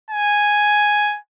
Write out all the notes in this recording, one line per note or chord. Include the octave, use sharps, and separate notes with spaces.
G#5